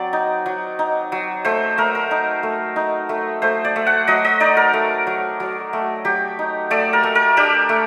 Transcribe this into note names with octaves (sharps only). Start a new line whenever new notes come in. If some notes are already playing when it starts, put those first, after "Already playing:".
Already playing: F#3 C4 D5
D#4
F#3
D#4
F#3
A3 C5
A3 A#4
A#4
D#4
A3
D#4
A3
A3 C5
D5
A3
F#5
F#3 D#5
D#5
D#4 D5
A#4
A3
F#3
F#3
A3
F#3 G4
D#4
A3 D5
A#4
A3
A#4
D4 G4
A3